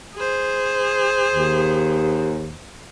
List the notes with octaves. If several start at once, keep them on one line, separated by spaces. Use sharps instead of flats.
G#4 C5
D#2